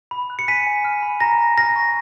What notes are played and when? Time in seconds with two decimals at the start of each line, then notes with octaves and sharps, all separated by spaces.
0.11 B5
0.30 F#6
0.39 C#7
0.48 G#5 B6 D#7
0.67 G#5
0.85 F6
1.02 B5
1.20 A#5 A#6
1.39 A#5
1.57 F6 A#6
1.76 C#6